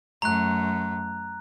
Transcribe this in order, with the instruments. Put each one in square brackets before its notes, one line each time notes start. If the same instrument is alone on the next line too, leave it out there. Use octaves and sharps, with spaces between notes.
[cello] F#2 A3 [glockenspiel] A#5 F#6